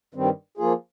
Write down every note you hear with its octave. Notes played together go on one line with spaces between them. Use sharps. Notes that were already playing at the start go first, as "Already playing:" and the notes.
G2 D#3 G3 C4
F3 A#3 F4 G#4